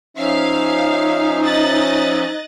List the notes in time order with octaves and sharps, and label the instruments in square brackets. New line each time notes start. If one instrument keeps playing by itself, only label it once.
[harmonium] F3 C#4 E5 [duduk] D#4 [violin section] F5
[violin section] D#5 F#6 A6